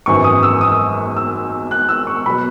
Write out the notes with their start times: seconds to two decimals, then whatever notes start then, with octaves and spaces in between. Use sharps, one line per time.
0.06 G#1 F#2 E3 C#6
0.24 D#6
0.43 E6
0.61 D#6
1.17 E6
1.71 F#6
1.89 E6
2.07 C#6
2.26 B2 F#3 B5